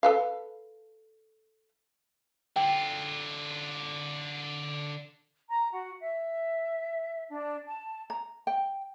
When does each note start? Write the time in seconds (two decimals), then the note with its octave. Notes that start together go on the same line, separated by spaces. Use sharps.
0.03 A4 B4 F5
2.56 D3 F4 G5
5.50 A#5
5.72 F#4
6.01 E5
7.29 D4
7.66 A5
8.10 A#5
8.47 G5